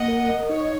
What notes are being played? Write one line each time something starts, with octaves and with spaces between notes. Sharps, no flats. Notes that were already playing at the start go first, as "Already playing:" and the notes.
Already playing: A#3 D#5 F#5
A#4
D#5
D#4 C#5